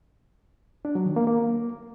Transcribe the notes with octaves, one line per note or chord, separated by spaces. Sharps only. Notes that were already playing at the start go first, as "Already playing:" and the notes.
D4
F#3
D#3
A#3
A#3